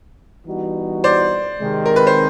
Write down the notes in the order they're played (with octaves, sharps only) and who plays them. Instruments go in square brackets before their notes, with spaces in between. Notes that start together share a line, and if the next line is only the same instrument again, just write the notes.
[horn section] E3 G3 B3 D#4 F#4
[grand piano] C5 D5
[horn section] C3 D#3 G#3
[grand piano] A#4
B4
C5